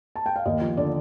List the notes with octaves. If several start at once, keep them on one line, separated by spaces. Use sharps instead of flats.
A5
G5
F5
D#2 D#5
F3
D3 D5